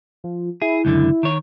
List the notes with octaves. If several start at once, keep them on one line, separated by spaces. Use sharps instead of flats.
F3
E4 G#4
C#2 F#2 D3
D#3 C#5